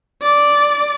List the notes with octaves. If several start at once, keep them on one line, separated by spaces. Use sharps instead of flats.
D5